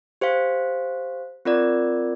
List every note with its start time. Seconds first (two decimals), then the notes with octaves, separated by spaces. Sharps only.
0.21 G4 C5 F5
1.45 C4 F4 A#4 D5